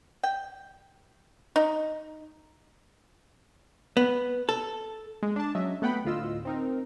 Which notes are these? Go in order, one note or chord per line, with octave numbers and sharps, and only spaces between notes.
G5
D#4
B3
A4
G#3
D4 A5
F#3 C#4 D#5 E5
A3 B3 F#5 G5 B5
D2 A2 F4 D#5 E6
C4 D#4 A#4